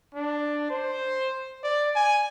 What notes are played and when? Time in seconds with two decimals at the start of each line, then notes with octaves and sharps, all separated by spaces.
0.15 D4
0.70 C5
1.64 D5
1.96 G#5